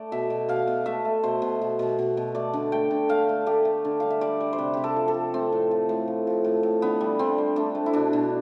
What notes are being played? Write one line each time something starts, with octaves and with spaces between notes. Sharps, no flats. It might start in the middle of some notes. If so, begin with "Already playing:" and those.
Already playing: A3 D5
B2 E5
B2
B2 F5
B2
A3 E5
A3
B2 C5
B2
B2
B2
B2
B2
A3 D5
D3
A3 G5
D3
A3 F5
A3
A3 G4
A3
D3
G3 F5
E5
G3 D5
G3
C5
C3 B4
C3 G4
A4
F3
A4
F3
A3 C4
A2
F3
A2
F3
F3
A2
A2
D3 B3
G3
D3 C4
G3
A3 D4
A3
E4
B2 D4
B2